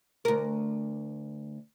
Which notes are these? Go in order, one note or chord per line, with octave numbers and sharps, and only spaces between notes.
D2 A#4